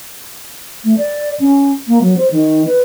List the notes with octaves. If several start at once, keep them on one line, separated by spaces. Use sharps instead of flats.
A3
D5
C#4
A#3
F#3
C5
D#3
B4